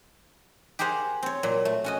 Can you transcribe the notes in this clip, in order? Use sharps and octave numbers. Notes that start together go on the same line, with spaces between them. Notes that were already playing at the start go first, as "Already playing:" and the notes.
G4 G#4 A#4 C5 F#5
C4 C#5
A#2 F#3
A3
C#4 F#4 D#5